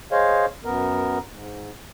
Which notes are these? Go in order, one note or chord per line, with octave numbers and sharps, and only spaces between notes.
G#4 C5 C#5 D#5 F5
F#2 B3 A#4
G#2